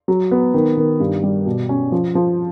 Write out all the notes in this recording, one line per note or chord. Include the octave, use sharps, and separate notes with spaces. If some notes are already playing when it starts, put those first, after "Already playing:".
F#3
B3
D#3
D#3
G2
G3
B2
C#4
F3
F3